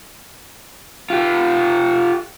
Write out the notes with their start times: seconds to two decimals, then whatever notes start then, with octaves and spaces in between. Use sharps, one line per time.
1.10 F4 G4